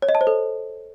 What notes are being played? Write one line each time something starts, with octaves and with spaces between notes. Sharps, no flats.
C#5
D#5
A5
C5
A4